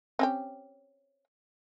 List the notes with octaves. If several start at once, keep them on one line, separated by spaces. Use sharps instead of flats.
C4 C#4 G4